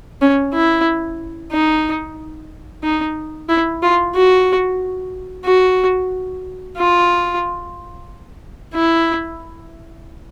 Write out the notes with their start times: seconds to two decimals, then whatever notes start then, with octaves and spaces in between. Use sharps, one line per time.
0.21 C#4
0.54 E4
1.52 D#4
2.83 D#4
3.49 E4
3.82 F4
4.15 F#4
5.45 F#4
6.77 F4
8.74 E4